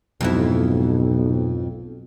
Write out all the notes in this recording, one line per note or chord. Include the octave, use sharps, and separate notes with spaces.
B1 F2 G#2 E4